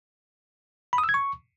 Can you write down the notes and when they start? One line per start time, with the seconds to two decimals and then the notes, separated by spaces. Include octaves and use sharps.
0.93 B5
0.98 D#6
1.04 E6
1.09 G#6
1.14 C#6